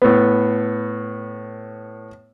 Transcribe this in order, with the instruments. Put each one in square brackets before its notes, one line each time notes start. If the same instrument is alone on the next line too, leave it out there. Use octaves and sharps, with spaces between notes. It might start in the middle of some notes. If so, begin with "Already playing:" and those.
[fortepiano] A2 B3